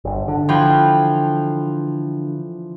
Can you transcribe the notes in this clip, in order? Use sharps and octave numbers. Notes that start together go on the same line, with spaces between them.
G1
D3
E3 F3 G5